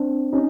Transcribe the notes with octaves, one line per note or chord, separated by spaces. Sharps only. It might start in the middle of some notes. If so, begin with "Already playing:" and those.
Already playing: C4 D4
C#4 D#4